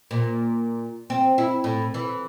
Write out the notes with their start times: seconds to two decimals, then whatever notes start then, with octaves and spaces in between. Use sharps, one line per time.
0.11 A#2
1.10 C4
1.38 E4
1.64 A2
1.94 E3